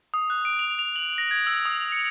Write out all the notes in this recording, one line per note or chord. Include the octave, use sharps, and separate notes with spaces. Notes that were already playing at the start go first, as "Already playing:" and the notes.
D#6
F#6
D7
F7
F7
F#7
A#6
G#6
E6
D#6
C#7